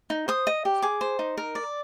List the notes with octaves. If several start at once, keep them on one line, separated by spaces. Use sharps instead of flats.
D#4
C5 D#6
D#5
G4
G#4 D6
C5
D#4
A#4
D5